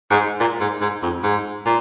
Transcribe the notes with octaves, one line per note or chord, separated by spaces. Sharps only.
G#2
A#2
G#2
G#2
F2
G#2
A#2